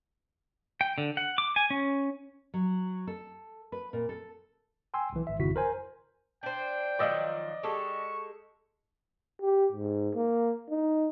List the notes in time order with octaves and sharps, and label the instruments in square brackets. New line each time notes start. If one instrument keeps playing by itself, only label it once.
[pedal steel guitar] G5
D3
F#5
D6
G#5
C#4
[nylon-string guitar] F#3
A4
B4
A#2
A4
[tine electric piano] G5 G#5 C6 E6
B1 E3
G#1 E5
G#1 F2 C#3 E4 F#4 B6
A#4 C5 G#5
[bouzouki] D4 C5 [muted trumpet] G5
[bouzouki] D#3 F3 F#3 [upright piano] D5 D#5 E6
[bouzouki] G#3 G4 A4 [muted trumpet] C#6
[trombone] G4
G#2
A#3
D#4